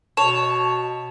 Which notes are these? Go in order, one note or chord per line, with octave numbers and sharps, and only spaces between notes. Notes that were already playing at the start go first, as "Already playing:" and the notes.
B2 C#5 A5 E7